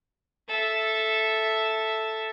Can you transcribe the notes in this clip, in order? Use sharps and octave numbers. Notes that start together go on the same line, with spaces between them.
A4 E5